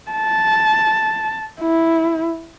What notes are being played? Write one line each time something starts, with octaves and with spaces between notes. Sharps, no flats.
A5
E4